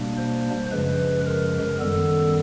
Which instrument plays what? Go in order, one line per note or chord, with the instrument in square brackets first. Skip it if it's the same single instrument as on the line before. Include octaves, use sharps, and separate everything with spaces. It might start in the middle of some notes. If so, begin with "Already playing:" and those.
Already playing: [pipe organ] B2 G3 A#3 D4
C5
F#2 C#3 F3 G#3 B4
A#4
F#2 D#3 G3 B3 A4